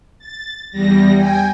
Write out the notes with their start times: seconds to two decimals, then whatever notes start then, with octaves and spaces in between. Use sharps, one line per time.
0.19 A6
0.71 E2 G3 A#6
1.15 G5 G#5